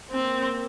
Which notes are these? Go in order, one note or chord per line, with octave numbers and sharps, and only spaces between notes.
A#3 C4